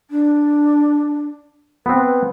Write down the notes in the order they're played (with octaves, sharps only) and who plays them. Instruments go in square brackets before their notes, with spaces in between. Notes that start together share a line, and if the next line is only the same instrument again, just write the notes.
[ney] D4
[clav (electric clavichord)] B3 C4 [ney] B4